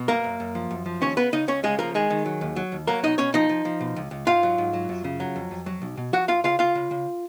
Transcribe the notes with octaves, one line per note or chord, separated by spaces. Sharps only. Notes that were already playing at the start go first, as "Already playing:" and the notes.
Already playing: B2
F#2 A#3 A#4
F#2
F#2
F3
F#2
F3
D#2 C#4 C#5
C#3 B3 B4
C#3 D#4 D#5
C#2 C#4 C#5
C#3 G#3 G#4
F3 A#3 A#4
D#3 G#3 G#4
D#3
F#3
D#2
F#3
D#2
F#3 A#3 A#4
B2 D#4 D#5
B2 C#4 C#5
F3 D#4 D#5
F3
F3
B2
C#2
C#2
G#2 F4 F5
F#3
G#2
F#3
F#2
C#3
F#3
F2
F2
F#3
B1
B2
F3 F#4 F#5
F#2 F4 F5
C#3 F4 F5
C#3 F4 F5
C#3
C#3